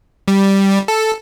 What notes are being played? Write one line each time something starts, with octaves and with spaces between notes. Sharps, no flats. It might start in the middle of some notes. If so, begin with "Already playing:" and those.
G3
A4